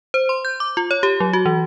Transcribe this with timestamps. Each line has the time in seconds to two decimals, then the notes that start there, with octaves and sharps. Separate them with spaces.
0.14 C5
0.29 C6
0.45 G6
0.60 D6
0.77 F4
0.91 C#5
1.03 G4
1.20 F#3
1.33 F#4
1.46 E3